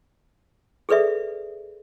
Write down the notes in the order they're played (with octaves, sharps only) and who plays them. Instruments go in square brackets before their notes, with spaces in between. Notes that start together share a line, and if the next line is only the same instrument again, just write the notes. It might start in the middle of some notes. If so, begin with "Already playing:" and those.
[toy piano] G#4 A4 B4 D5 E5